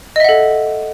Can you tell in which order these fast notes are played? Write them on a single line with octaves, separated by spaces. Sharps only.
D#5 E5 F#5 A4